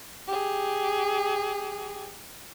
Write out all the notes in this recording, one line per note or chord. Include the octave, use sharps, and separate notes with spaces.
G4 G#4